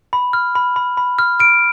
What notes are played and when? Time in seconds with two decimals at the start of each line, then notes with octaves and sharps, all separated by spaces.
0.13 B5
0.33 F6
0.55 B5
0.76 B5
0.97 B5
1.19 F6
1.40 F6 D7